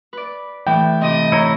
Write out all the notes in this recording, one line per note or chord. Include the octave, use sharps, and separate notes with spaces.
B4 D5
A2 E3 G5
A2 C3 C4 D#5
E4 C#5 A#5